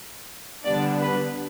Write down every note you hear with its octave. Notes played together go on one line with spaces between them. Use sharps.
D3 G3 B3 D4 D5
B4